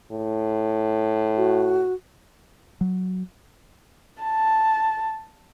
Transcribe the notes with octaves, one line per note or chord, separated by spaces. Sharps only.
A2
F#4
F#3
A5